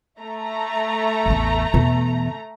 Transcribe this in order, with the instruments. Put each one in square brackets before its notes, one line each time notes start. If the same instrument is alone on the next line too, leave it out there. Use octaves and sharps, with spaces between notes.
[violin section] A3 A#5
[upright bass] A1 E2
E2 B2